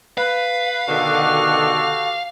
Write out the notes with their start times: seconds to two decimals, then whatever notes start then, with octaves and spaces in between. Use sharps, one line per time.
0.18 B4 F5
0.89 B2 D3 D#3 F#4 G4 A4